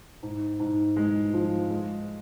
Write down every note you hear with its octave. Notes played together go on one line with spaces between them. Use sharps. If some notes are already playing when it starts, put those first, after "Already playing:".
G#2
G#2
G#3
F3
G#3